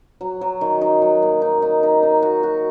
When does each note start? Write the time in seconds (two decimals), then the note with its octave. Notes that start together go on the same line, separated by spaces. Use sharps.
0.21 F#3
0.41 F#3
0.61 D#3
0.81 D#4
1.02 F#3
1.23 A#3
1.42 D#4
1.62 D#4
1.83 D#4
2.03 D#4
2.22 F#4
2.43 F#4